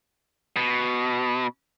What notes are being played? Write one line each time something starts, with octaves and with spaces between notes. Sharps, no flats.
B2